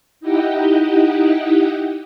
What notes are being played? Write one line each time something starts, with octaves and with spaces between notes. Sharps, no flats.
D#4 E4 G4 D#5 F#5 G5